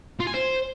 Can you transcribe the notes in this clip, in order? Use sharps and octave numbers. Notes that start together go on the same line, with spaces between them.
F4
G#5
C5